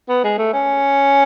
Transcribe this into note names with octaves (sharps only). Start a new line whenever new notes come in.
B3
G#3
A3
C#4